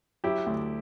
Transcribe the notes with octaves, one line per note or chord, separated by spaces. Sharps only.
F#3 E4 G4
D2